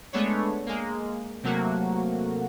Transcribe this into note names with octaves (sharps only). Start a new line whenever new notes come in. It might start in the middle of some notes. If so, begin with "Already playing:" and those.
G#3 A3 B3 D4 C#5
G#3 A#3
C3 F#3 A3 A#3 F#4